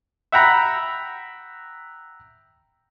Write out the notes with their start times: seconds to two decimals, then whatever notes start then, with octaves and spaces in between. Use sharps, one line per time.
0.32 E5 F#5 G5 A#5 B5